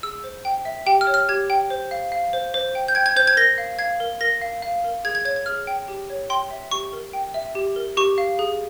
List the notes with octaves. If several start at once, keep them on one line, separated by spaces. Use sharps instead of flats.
G#4 E6
C5
G5
E5
G4 G5
F6
C#5
F6
G4 G#6
G5
C5
F5
F5
C5
C5
G5
G6
G5 G#6
G#6
C5 G6
G#6
A#4 A#6
F5
F5 G#6
A#4
A#4 A#6
F5
F5
A#4
G#4 G#6
G#6
C#5 G#6
G#6
G#4 F6
G5
G4
C#5
G5 C6
E5
G4 C#6
A#4
G5
E5
G4
A#4
G4 C#6
F5
G#4